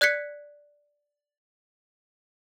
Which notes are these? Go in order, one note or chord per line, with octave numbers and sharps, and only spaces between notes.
D5 F#6 G#6 B6 C#7